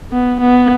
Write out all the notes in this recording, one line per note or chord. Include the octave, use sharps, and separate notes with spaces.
B3
B3